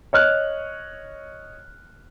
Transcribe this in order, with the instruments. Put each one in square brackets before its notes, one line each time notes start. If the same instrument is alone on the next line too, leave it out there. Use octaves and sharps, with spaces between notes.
[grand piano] C#5 D#5 F6 F#6